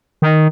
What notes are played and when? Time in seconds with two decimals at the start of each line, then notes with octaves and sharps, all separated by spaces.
0.22 D#3